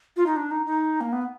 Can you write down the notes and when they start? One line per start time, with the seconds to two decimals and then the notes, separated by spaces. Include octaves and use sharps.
0.16 F4
0.26 D#4
0.36 D4
0.51 D#4
0.66 D#4
1.01 A#3
1.12 B3